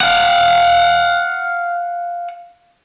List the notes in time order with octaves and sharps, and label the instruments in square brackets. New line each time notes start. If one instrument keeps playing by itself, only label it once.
[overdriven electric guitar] F5 F#5